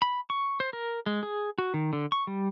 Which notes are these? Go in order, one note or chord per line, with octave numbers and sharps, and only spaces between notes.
B5
C#6
C5
A#4
G#3
G#4
F#4
D#3
D3
C#6
G3